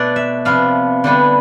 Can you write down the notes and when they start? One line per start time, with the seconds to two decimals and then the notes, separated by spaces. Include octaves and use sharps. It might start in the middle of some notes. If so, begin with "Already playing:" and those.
Already playing: B2 A3 D4 D5
0.16 E5
0.45 C3 F3 B3 D4 F5
1.04 D3 G3 B3 D4